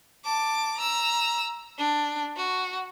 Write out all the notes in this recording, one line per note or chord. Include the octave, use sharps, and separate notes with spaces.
A5 D6
A#5 E6
D4
F#4